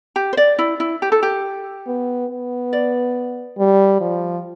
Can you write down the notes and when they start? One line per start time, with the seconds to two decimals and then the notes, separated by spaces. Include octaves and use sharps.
0.16 G4
0.33 C5
0.37 D5
0.59 E4
0.80 E4
1.02 G4
1.12 A4
1.23 G4
1.87 B3
2.30 B3
2.73 D5
3.58 G3
4.01 F3